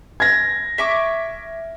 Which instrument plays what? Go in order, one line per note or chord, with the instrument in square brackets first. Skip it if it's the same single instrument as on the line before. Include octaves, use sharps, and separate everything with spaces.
[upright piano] G#6 A#6
[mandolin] E5 C#6 D6